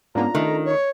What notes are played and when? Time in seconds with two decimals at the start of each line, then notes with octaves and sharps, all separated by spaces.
0.15 G#2 A#3 B3 C#4 D4 F4 A#5
0.35 D#3 A3
0.65 C#5